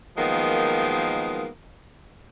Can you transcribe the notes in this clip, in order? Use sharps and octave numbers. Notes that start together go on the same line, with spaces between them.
D#3 F3 F#3 G#3 A#3 B3